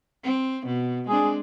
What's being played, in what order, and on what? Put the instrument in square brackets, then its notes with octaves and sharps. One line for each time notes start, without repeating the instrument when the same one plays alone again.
[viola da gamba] C4
B2
[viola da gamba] G#3 C4 D4 [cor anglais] G#4